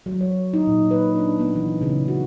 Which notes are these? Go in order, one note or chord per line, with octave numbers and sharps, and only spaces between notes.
F#3
C#5
D#4
A#2
B4
D4
B3
E3
C#3
F#4